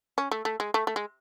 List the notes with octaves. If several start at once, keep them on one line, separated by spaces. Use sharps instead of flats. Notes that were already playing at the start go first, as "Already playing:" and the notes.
C#4
A3
A3
G#3
A3
A3
G#3